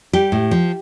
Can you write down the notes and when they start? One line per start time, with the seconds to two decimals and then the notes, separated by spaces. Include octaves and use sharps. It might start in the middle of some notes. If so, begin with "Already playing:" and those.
0.13 G3 G4
0.32 A2
0.51 F3